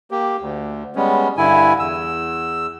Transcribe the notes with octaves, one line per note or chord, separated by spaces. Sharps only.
A#3 G4
D2
G3 G#3 B3 C#4
G2 D3 E4 G#5
E2 E6